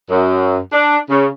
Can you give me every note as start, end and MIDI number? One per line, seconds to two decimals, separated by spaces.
0.10 0.56 42
0.71 0.96 62
1.09 1.26 49